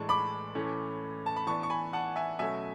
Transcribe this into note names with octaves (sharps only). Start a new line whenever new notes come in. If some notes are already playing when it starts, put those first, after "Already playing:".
Already playing: A2 E3 G#3 D4 A5 C#6
B5 D6
A2 E3 A3 C#4
A5
B5
E3 B3 D4 A5 C#6
C#6
G#5 B5
F#5 A5
E5 G#5
B2 F#3 A3 C#4 E5 G#5